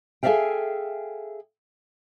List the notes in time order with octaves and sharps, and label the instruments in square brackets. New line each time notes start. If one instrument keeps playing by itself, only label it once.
[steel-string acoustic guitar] G#4 A4 D5 E5 F5 G5